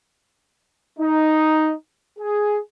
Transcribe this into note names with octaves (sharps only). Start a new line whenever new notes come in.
D#4
G#4